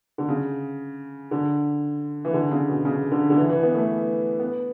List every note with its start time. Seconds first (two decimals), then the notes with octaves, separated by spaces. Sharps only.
0.18 D3
0.29 C#3
1.31 D3
2.25 E3
2.33 D3
2.51 C#3
2.68 B2
2.85 C#3
3.12 D3
3.30 D3
3.36 E3
3.50 E3
3.63 B3
3.75 A3
4.39 B3